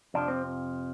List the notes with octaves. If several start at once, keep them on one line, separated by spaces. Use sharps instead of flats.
F2 C3 F3 D4
C4